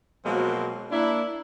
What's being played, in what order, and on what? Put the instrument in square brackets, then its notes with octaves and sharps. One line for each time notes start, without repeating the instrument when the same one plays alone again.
[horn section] B2 F3 F#3 G#3 A#3 C4
A#3 D4 E4